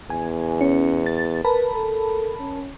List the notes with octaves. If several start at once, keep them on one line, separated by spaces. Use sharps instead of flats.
E2 G#5
C#4
A6
A#4 B4 A5 B5
A4
C#4